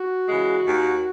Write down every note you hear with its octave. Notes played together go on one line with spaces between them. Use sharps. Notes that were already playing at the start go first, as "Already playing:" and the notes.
Already playing: F#4
C#3 E3 G#3
D#2